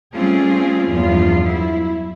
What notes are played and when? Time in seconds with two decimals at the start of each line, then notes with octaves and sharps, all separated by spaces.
0.15 G3 A3 C4 C#4 F4 G#4
0.90 E2 G2 F3 B3 F4
1.46 F#3 E4